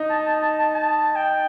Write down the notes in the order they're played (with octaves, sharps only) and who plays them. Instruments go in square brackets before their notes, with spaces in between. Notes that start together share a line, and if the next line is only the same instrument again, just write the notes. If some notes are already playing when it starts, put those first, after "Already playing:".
Already playing: [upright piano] D#4
[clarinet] A5
A5
A5
A5
A5
G5